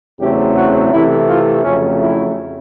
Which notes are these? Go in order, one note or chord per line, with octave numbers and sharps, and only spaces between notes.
E2 C#3 F#3 A3 C4 G4
F#4
C3 E3 A3 E4
F4
F2 C#3 F#3 A3 C#4
E4